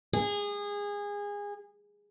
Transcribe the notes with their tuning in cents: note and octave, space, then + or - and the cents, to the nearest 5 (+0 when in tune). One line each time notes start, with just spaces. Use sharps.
G#4 -25